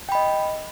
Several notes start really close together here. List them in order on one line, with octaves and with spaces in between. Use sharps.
G5 B5 D#5